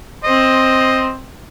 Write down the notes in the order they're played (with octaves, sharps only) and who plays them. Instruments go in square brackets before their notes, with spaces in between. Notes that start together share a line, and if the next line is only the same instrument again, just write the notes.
[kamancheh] C4 C5 [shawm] D#5